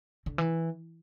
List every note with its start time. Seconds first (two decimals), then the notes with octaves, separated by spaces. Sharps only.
0.26 D3
0.38 E3